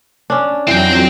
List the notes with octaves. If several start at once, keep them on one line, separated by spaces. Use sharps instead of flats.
C#4 D4
F2 E3 F#3 C4 G5 A#6